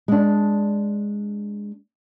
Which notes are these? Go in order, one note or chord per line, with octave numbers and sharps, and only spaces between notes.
G#3 D4